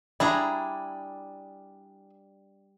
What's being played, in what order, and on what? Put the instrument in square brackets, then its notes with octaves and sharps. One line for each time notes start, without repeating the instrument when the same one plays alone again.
[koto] G3 D4 A#5 [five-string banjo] E4 G#4